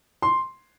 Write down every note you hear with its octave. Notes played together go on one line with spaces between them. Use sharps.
C6